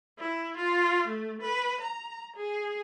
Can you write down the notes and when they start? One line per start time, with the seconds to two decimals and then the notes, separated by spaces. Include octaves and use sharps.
0.19 E4
0.57 F4
1.07 A3
1.42 B4
1.81 A#5
2.36 G#4